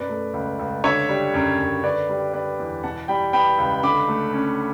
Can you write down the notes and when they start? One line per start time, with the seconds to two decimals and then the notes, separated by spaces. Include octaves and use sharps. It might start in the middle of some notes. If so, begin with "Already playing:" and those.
Already playing: F#2 B2 B4 D5
0.09 A3
0.34 C#2
0.59 C#2
0.84 D3 C#5 E5
1.09 G3
1.34 F#2
1.59 F#2
1.84 D3 B4 D5
2.09 G3
2.33 B3 B4 D5
2.59 E2
2.83 B2 F#5 A5
3.08 G3 G5 B5
3.33 B3 G5 B5
3.58 C#2
3.83 D3 B5 D6
4.08 A3
4.34 C#4